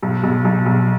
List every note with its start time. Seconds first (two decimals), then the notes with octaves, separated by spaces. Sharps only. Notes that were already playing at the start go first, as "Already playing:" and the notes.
0.03 B1
0.23 B1
0.45 B1
0.66 B1